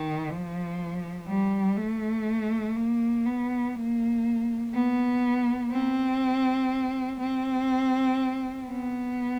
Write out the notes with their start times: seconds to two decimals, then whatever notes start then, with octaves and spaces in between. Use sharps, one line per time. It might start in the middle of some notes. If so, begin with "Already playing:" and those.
Already playing: D#3
0.30 F3
1.28 G3
1.77 A3
2.76 A#3
3.26 B3
3.75 A#3
4.74 B3
5.72 C4
7.20 C4
8.68 B3